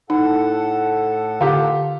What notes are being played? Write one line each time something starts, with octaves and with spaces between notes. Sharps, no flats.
A2 D#4 A4 F#5
D3 F4 G4